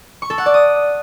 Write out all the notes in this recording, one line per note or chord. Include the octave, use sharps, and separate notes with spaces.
C#6
A4
F#5
D5
D#6